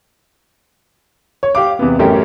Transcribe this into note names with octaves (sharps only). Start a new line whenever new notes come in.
C#5
G4 F5 D6
E2 C3 B3
A1 F#2 A3 C#4 G4 A#4